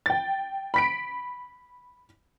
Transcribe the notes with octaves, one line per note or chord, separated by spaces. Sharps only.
G5 A6
B5 B6 D7